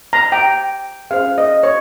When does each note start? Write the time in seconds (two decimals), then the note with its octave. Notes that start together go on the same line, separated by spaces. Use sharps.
0.13 A#5
0.32 G5
1.11 C#4 G#4 C5 F5
1.38 D#5
1.63 C#5